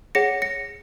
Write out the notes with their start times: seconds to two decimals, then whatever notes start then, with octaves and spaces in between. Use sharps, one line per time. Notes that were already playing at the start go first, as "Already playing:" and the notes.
0.15 G#4 C#5 F#5 A#6 C#7
0.42 A#6 C#7